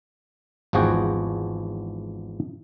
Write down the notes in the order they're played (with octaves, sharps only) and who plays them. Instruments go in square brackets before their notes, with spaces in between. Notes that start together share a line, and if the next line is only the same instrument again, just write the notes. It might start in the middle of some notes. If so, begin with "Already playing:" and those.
[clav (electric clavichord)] G#1 E2 F3 F#4 G#4 G5